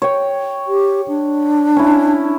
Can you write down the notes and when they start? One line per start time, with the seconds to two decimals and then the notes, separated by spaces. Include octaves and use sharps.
0.02 C#5 G5
0.67 G4
1.08 D4
1.77 C#4 E4